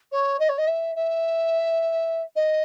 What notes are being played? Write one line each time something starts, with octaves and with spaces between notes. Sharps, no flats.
C#5
D#5
C#5
D#5
E5
E5
D#5